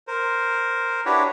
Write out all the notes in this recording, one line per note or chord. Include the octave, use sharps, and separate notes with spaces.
A#4 C5
D4 E4 F#4 G4 B4 C#5